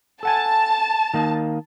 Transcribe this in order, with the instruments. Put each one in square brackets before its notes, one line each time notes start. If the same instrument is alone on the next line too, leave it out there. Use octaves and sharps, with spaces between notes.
[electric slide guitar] A4 F#5 G#5 [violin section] A5
[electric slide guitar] D#3 A#3 D#4